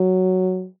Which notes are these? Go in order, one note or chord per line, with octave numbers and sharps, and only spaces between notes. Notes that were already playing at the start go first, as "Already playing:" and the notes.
Already playing: F#3